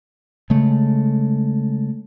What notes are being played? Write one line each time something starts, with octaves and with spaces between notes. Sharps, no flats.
C#3 G#3 A3